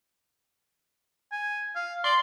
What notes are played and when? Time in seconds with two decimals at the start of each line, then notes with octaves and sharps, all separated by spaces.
1.32 G#5
1.75 F5
2.04 D5 C6